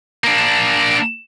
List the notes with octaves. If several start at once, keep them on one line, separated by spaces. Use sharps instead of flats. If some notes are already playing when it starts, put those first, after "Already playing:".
A#3 D4